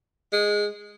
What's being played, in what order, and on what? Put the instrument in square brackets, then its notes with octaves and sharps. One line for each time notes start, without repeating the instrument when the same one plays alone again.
[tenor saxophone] G#3